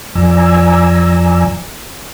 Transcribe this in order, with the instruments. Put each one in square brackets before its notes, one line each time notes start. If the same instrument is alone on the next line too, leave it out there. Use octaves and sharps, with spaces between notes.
[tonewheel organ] F2 F3 D5 G#5 A#5 E6